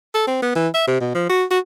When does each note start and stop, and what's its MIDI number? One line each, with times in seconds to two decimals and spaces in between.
0.15 0.27 69
0.27 0.41 60
0.42 0.51 59
0.56 0.68 52
0.75 0.84 76
0.88 0.99 48
1.01 1.11 47
1.15 1.25 53
1.30 1.44 66
1.51 1.59 66